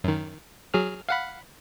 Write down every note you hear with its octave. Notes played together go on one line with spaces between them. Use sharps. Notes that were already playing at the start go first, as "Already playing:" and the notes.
F#2 D#3
F#3 G#4 F6
F5 F#5 B5